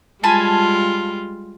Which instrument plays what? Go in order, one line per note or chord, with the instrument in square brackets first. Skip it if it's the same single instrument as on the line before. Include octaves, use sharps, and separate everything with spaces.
[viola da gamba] G3 G#3 F4 [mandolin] G#5 A5 B5